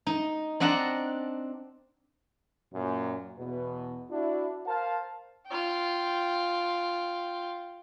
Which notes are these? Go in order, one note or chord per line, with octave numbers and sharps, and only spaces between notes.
D#4
C4 D4 D#5 F#5 A5 A#5
F#2 A#2 A#3
E2 B2 B3
D4 E4 F#4
A#4 C5 F5 A5
F4 G5